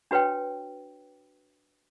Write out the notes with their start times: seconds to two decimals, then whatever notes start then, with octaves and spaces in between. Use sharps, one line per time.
0.11 D4 F#4 B4 C#5 G5